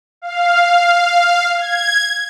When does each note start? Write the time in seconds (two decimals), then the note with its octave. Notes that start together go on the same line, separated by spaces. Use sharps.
0.22 F5
1.58 G#6